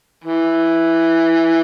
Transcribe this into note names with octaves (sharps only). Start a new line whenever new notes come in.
E3